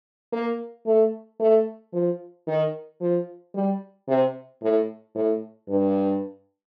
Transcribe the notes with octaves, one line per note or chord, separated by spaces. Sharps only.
A#3
A3
A3
F3
D#3
F3
G3
C3
A2
A2
G2